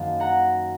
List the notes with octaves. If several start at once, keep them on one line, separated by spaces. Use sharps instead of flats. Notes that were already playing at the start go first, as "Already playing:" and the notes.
Already playing: F#2 D#3 A#3 F5 A5
F#5 A#5